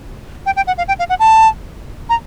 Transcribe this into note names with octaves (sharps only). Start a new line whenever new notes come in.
G5
G5
F#5
F5
G5
F5
F#5
A5
A#5